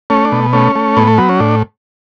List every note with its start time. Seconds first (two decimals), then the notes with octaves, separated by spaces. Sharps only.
0.10 A3 C#4
0.25 D4
0.32 B2
0.53 A3 C#4
0.76 A3
0.97 A2 B3
1.07 A3
1.18 F#3 B3
1.29 C#4
1.40 A2 D4